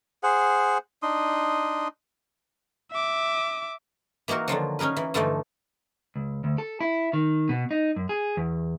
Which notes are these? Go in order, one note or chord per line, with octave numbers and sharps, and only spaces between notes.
G#4 C5 F#5
D4 D#4 C6 D#6
E5 D6
E3 A#3 D#4 F#4 A#4
D3 D#3 F3 F#3
C#4 D#4 G#4 A#4 B4
E3
G2 D3 E3 F3 A3 D#4
C#2
D2
A4
E4
D#3
B2
D#4
F#2
G#4
E2